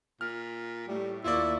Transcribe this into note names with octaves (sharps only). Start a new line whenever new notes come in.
A#2 F6
A2 G3 A3
D#2 A#3 E4 F4 D5 C#6